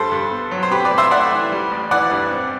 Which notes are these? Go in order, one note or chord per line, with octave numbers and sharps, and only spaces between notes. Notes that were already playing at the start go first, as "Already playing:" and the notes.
Already playing: G2 A4 C5
G2
B3
F#3
C5
C4 G4 B4
B4 D5
A2
C5 E5
A3 D5 F#5
E3
G3
A1
E3 D5 F#5
G2
C4